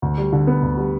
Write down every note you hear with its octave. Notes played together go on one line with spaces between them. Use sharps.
D2
G3
D3
B3
D2
G3